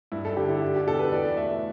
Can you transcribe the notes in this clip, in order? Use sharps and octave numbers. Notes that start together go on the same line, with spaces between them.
G2 E4
A4
D3 G4
E4
G3 G4
G4
B2 A4
B4
E2 D5
A3 E5